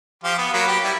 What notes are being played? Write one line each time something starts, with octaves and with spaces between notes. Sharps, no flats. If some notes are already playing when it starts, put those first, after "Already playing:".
F3 F4 G4
B3
F#3 A#3 B5
G4 B4
G3 E4